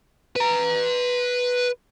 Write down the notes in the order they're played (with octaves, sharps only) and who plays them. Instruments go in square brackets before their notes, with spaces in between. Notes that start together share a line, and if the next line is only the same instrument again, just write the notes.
[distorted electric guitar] B4 A#5